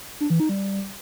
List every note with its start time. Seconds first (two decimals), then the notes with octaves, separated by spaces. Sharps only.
0.21 D4
0.30 E3
0.40 D#4
0.49 G3